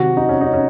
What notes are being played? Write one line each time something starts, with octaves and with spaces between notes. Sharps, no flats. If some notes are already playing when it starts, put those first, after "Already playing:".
Already playing: C3 D#3 F#3 F#4
D#4
C#4
D#4
C#4